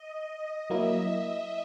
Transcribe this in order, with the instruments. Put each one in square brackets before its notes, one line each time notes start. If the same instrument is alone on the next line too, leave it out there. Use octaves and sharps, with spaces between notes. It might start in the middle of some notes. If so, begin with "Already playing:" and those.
Already playing: [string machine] D#5
[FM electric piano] F#3 A#3 E4 [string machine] E5